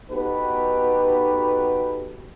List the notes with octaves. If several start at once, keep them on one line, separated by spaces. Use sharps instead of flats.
B3 D#4 F#4 G4 A4 B4